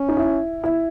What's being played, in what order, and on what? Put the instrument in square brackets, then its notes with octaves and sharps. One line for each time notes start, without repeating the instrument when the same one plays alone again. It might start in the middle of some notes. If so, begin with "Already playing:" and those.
Already playing: [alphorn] C#4
[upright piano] D#4
E4
E4